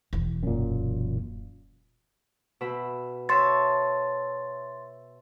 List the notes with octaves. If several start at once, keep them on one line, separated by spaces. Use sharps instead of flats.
E1 E3
F#2 A#2
B2 E5 B5
C#5 E5 A5 C6 A6